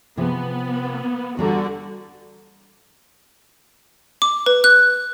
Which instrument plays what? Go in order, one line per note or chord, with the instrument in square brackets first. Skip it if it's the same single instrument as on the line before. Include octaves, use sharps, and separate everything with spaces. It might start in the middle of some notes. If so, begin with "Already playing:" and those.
[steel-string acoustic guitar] C3 F3 G#4 [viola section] B3
[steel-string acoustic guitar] E2 G3 A#5 [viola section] D3 F#4
[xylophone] D6
B4
F#6